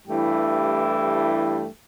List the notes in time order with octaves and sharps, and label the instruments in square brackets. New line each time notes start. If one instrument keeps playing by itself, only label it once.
[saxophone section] G2 E3 A3 E4 G4